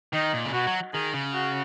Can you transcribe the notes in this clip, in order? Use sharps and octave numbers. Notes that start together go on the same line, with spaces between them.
D#3 D#4
A#2
C#3
B2 F#4
F#3
D#3 G#4
C#3
F#4